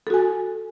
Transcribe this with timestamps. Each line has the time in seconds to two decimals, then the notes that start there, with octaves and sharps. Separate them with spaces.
0.07 A4
0.10 F#4
0.14 G#5